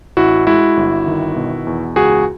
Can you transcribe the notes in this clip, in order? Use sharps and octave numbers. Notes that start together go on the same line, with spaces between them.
A1 E4 F#4
G#3 E4 F#4
G1
D#3
B2
E2
C#2 F#4 G#4